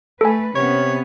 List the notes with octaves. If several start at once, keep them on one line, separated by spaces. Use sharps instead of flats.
A3 A4 B4 G#5
C3 B3 C#4 C#5